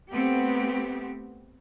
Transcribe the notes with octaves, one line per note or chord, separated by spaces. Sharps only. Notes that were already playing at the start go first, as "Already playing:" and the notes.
A3 B3 C4 G4